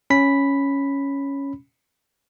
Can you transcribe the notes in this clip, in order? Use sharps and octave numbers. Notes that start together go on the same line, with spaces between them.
C#4 B5 B6